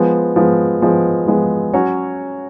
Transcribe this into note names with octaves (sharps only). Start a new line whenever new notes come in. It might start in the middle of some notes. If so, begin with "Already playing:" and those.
Already playing: F3 G#3 B3
F3 G#3 B3
F3 G#3 B3
F3 G#3 B3
F#3 C#4 F#4 C#5